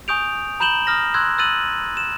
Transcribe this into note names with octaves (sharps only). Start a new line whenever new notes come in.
G#5 C#6 D#6 G6 D7 F7
A#5 B5 G6 E7 F#7 G7
D#6 F6 A#6
C6 E6 F#6 G#6
E6 F#6 A6 D#7 F#7
E7